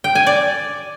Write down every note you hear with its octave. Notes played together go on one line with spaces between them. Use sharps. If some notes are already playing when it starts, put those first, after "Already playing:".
G5
G#5
D5